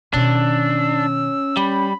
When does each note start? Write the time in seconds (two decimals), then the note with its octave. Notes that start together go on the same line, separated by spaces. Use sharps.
0.14 B2 D#3 C#4 D4 E6
1.57 G3 B5